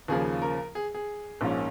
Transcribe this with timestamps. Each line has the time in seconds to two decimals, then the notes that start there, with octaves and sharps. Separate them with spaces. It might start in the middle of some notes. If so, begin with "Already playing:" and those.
0.08 D#2 C#3 F3 A#3 G#4
0.42 A#4
0.75 G#4
0.94 G#4
1.41 A#1 G#2 F3 A#3 C#4